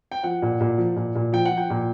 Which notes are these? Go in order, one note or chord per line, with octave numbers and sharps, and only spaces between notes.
G5
F3 F#5
A#2
A#2
F3
A#2
A#2
F3 G5
F#5
F3
G5
A#2